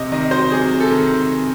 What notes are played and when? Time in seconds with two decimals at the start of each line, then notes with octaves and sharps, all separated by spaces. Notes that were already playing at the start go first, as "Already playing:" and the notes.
Already playing: C3 D#5
0.12 D#3 D#5
0.31 F#3 C5
0.51 C3 G#4
0.71 C3
0.80 A4
0.90 D#3